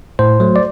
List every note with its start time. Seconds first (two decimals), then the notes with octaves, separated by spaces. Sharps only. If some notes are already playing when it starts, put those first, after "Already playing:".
0.19 A2 C5
0.40 F#3 A3
0.56 D5